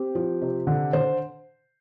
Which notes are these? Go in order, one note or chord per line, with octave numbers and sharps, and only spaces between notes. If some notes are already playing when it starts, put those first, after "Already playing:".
Already playing: C4 G4
F3
C3
D3
D3 C5